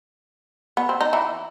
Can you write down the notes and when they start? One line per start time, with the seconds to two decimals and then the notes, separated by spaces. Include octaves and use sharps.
0.77 B3
0.89 C4
1.01 D#4
1.13 E3 E4